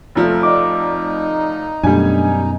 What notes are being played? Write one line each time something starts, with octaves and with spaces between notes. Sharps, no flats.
F1 F3 A3
D#4 D5 D6
F#2 B2 G3 A3 D4 G#5